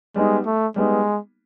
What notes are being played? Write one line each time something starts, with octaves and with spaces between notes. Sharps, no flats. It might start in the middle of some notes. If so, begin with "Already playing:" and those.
G3 G#3 B3 D#4
A3
G3 G#3 B3 D#4